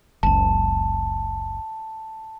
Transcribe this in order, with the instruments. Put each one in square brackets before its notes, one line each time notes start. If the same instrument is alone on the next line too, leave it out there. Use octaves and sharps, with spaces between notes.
[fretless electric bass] F#1 C#2 [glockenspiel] A5